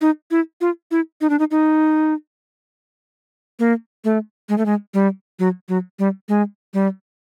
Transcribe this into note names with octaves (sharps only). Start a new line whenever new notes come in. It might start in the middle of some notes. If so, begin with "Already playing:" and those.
D#4
E4
F4
E4
D#4
D4
D#4
D#4
A#3
A3
G#3
A3
G#3
G3
F#3
F#3
G3
G#3
G3